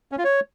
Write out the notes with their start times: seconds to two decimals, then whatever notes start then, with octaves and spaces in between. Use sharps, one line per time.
0.12 C#4
0.18 F4
0.25 C#5